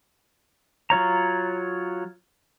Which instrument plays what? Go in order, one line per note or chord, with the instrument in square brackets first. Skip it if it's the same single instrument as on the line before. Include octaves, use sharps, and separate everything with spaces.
[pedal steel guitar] F#3 F4 C#5 A#5